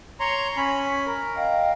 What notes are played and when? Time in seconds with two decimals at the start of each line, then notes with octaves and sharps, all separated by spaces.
0.20 C#5 A#5 C6
0.57 C#4 B5
1.06 A#4
1.36 D#5 F5 G5